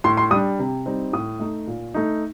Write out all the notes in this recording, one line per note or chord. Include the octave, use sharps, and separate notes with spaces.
A2 C6
C6
G3 D4 D#6
C3
G3 C4 D#4
A2 D#6
A3 D#4
A#2
A3 D#4